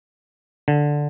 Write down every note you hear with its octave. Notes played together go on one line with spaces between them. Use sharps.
D3